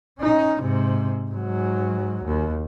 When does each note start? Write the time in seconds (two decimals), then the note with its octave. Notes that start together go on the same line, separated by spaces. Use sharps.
0.19 C#4 D#4
0.61 G#2 C3
1.30 G#2 F#3
2.24 D#2